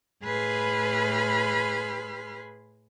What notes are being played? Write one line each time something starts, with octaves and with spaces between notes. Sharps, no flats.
A2 G#4 B4 B5 C6 F6